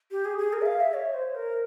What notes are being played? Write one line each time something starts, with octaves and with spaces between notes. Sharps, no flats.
G4
G#4
G#4
A#4
E5
F5
E5
C#5
C5
A#4